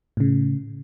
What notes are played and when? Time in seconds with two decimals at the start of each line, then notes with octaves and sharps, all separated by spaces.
0.17 A2 C#3